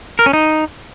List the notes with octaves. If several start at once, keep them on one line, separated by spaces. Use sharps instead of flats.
A#4
C#4
D#4